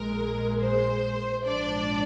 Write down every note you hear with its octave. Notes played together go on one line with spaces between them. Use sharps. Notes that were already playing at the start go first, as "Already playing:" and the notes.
Already playing: A#1 A#2 G#3 A#4
C5
A#1 G#2 F3 D4 D5